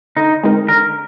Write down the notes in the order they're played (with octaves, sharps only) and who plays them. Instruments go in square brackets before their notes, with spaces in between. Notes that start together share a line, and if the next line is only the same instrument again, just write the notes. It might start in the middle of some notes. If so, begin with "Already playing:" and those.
[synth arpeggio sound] D3 [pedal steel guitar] D#4
[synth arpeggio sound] G#3 C4 D#4 A#4
[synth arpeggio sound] D3 [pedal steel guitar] A#4